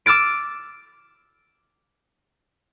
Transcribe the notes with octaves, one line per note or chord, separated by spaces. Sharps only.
D6 E6 F6 A6 D7